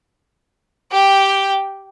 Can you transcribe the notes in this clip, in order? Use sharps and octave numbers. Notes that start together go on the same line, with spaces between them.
G4 G5